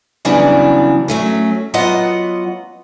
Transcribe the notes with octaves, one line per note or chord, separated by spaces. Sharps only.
C#3 E3 F#3 G3 B3 D4
F#3 A3 C#4
F#3 B3 F4 D#5 F#5